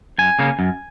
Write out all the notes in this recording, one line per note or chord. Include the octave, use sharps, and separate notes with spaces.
F#2 G#5
C#3 A#3 C#4
F#2